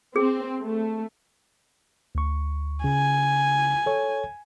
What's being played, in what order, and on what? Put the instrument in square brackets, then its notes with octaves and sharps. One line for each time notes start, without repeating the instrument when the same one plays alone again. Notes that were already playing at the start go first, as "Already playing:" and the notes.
[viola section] C4 [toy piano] G#4
[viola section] A3
[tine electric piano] D2 C#6
[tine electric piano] C#3 [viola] G#5
[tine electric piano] A4 C#5